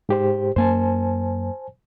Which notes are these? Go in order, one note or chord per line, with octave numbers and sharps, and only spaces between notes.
G#2 G4 C5
F#2 A#3 C5 G#5 A5